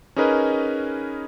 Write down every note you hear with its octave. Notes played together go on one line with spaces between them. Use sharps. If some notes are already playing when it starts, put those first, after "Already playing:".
C#4 D#4 G#4 A#4 B4 D#5